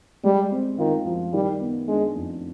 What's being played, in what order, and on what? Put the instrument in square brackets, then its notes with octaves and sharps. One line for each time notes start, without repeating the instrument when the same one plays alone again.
[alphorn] G3 [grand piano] G#3
[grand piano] C4
[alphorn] D#3 [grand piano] F4
[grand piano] F3
[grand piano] D#3 [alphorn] G3
[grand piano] B3
[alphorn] G#3 [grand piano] D4
[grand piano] F2